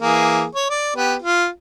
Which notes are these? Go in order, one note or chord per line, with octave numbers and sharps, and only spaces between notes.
E3 A#3 G#4
C#5
D5
B3 G4 B4
F4